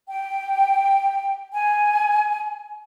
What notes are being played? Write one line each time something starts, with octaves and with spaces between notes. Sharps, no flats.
G5
G#5